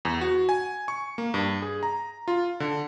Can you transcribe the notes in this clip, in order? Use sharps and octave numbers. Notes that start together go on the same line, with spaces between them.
E2
F#4
G#5
C#6
A#3
G2
G#4
A#5
F4
D3